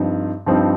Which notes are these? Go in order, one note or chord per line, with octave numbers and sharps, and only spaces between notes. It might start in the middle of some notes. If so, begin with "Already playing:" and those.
Already playing: G2 F3 C4 D#4
G2 F3 C4 D#4